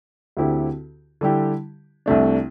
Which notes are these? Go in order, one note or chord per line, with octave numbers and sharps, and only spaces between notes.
D2 D3 C4 E4 G4
D3 G3 E4 G4
C2 C3 A3 D4